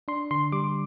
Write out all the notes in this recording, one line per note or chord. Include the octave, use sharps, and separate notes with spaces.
D4 C6
D3 C6
G3 D6